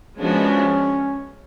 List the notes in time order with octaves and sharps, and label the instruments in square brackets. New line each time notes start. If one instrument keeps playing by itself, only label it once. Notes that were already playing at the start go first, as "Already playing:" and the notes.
[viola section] F3 G#3 B3 D4 F#4 [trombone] C#4